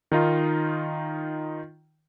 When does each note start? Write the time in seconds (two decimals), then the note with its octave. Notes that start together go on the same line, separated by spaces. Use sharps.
0.12 D#3 D#4 F4